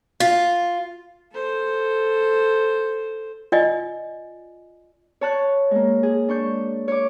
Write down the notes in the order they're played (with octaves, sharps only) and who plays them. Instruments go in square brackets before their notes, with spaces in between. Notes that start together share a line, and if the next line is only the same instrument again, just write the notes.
[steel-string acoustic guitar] F4
[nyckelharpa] A4 C5
[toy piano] F4 D5 D#5 G#5
[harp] C#5 A5 F#6
G#3 A#3
G#4
D4 C#6 G6
C#5 D6